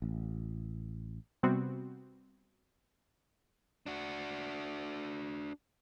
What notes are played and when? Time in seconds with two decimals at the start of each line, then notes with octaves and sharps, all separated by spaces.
0.02 A1
1.43 C3 G3 B3 C4 F#4
3.86 D4 F#4